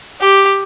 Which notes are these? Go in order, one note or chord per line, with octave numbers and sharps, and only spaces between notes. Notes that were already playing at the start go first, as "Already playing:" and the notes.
G4